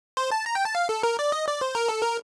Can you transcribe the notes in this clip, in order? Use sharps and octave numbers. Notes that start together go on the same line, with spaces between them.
C5
A5
A#5
G5
A5
F5
A4
A#4
D5
D#5
D5
C5
A#4
A4
A#4